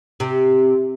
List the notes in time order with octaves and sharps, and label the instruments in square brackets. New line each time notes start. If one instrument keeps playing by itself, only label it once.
[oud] C3